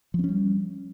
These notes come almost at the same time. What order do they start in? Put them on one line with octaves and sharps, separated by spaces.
F3 C4 C#4 G3